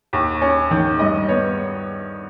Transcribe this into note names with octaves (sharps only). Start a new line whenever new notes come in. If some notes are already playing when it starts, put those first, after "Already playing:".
D#2
C#4
D#3
G2 D#5
B3 C#5